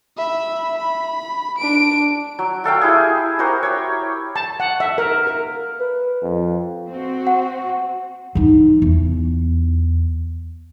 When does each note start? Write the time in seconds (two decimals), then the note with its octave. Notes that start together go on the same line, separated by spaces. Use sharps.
0.17 E5 B5
0.78 B5
1.58 D4 D7
2.39 F#3
2.64 F#4 A4 F5 G5
2.81 E4 G4 G#4
3.39 F#4 G4 A#4 C5
3.63 G4 C#5
4.36 A5
4.60 F#5
4.80 E5
4.98 A#4
5.27 A#4
5.80 B4
6.22 F2
6.88 C4 F#4
7.27 F#5
8.35 E3 D#4
8.82 E2